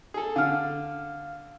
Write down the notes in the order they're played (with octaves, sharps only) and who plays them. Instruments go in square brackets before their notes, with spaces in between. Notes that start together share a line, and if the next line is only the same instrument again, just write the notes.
[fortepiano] G#4 A4
[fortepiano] D3 [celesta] F5 F6